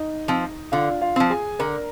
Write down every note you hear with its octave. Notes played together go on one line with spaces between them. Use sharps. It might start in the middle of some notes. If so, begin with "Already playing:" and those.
Already playing: D#4 D#5
F3 C4
D3 F4 F5
F4 F5
F3 C4
G#4 G#5
D3 A#4 A#5